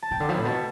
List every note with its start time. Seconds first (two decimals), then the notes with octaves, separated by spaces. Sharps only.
0.02 A5
0.11 C3 G5
0.20 D3
0.29 F3
0.34 A2 B5
0.45 B2 A5